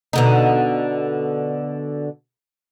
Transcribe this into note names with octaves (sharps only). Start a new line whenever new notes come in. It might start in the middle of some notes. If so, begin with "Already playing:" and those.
B2 D3 D#4